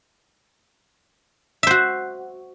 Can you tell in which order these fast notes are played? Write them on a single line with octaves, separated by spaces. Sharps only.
E5 C5 F#4